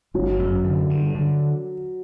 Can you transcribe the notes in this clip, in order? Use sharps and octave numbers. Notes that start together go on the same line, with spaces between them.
G1 F#3
F#2
D3
G2
D3